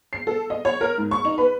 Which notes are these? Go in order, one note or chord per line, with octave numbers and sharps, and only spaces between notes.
C7
A4
D#5
C#5
A#4
G#2
C#6
D#4
B4